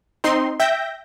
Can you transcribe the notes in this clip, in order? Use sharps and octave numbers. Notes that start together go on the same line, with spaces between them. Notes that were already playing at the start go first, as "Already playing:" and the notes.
C4 D#4 C6
E5 G5 G6 A#6